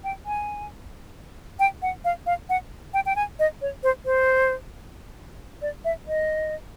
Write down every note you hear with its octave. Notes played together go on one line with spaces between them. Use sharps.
G5
G#5
G5
F#5
F5
F5
F#5
G5
G5
G#5
D#5
C#5
C5
C5
D5
E5
D#5